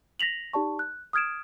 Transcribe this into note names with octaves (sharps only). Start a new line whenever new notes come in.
A#6 B6 F7 F#7
D#4 G4 D5 A5 C#6
F#6
D#6 F6 G#6 D7 E7